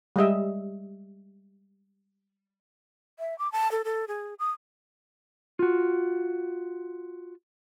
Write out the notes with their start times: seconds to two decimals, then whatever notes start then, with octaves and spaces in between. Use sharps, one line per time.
0.16 G3 G#3 D#5 E5
3.19 E5
3.39 D6
3.52 A5
3.72 A4
3.85 A4
4.08 G#4
4.39 D#6
5.59 F4 F#4